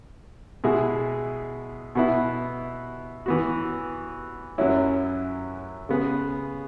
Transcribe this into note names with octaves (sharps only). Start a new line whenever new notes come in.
B2 G#3 E4 G#4
B2 B3 E4
E3 B3 F#4
F#2 F#3 C#4 E4
C#3 G#3 B3 G#4